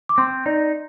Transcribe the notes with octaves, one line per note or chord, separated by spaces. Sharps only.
D6
C4 C6
D#4 D5